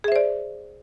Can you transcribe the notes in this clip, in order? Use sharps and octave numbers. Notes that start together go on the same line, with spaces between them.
G#4 C5 D5 E5